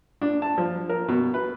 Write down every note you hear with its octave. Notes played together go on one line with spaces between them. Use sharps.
D4
A5
F3
A#4
B2
B4